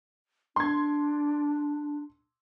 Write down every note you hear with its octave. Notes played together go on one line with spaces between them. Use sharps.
D4 C6 G#6